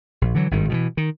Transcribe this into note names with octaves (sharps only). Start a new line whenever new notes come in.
A#1
D3 E3 F#3
G#1 G2 D#3
B2 D#3 E3
D#3